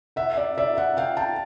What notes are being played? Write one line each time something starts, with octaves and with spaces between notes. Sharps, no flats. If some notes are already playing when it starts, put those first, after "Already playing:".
E5 F#5
D5 E5
D5 E5
E5 F#5
F5 G5
G5 A5